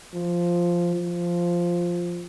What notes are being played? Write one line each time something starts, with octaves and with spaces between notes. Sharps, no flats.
F3
F3